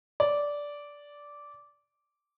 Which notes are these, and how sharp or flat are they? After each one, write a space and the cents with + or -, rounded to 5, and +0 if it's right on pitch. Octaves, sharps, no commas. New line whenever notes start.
D5 -10